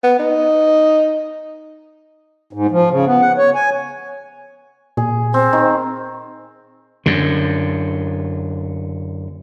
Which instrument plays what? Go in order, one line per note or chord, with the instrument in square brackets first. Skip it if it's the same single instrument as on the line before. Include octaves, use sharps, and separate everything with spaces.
[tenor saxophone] B3
D#4
[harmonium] G#2
F3
C#3
B3
F#5
C#5
G#5
[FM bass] A#2 [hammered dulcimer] G#4
[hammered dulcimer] C4 [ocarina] C5
[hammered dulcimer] D#3
[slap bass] F#2 D3